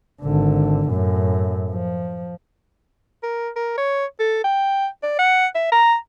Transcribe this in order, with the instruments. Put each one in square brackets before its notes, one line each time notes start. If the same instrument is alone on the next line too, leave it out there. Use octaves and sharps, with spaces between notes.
[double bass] G#1 D3
F#2 A2
F3
[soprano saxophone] A#4
A#4
C#5
A4
G5
D5
F#5
E5
A#5